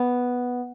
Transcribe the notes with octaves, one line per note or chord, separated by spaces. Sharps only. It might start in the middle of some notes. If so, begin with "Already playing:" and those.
Already playing: B3